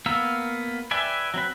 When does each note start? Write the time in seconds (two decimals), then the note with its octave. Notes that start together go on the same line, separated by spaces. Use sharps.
0.06 A#3 B3 A#4 F5 E6
0.91 B4 D5 E5 G5 G#5
1.34 F#3 C4 B4